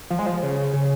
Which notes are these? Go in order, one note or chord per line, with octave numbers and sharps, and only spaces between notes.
F3
G#3
F3
C#3
C#3